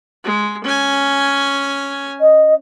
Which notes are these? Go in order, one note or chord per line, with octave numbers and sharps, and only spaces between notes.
G#3
C#4 G#5
D#5